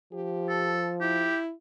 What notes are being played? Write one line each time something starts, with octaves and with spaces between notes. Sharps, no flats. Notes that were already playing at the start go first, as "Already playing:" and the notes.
F3 G4
A4
E4 G4